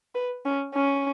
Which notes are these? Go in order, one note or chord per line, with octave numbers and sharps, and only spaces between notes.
B4
C#4
C#4